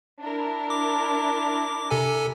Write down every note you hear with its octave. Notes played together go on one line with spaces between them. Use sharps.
D4 E4 A#4
D6
C3 A4 G#5